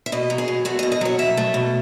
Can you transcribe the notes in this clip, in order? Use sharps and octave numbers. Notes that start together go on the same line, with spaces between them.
E5
B2 D#5
F#3
G#4
B2
A3 F#4
D#5
B2
D#5
F#3 C#5
B2 E5
A3
B2